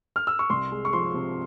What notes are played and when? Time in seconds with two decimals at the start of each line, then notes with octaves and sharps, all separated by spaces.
0.16 F6
0.27 E6
0.39 C#6
0.50 C2 C6
0.72 G#3
0.85 C#6
0.93 F3 C6
1.14 C3